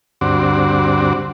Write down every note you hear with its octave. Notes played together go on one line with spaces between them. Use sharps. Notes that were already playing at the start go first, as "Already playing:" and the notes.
D2 G2 C4 F#4 D5